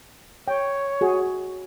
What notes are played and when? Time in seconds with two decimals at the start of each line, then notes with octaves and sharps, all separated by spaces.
0.48 C#5 G5
1.01 F#4 G#4